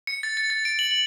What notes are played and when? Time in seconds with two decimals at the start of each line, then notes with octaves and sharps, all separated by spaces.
0.07 C#7
0.23 A6
0.37 A6
0.50 A6
0.65 D7
0.79 F#7
0.91 F#7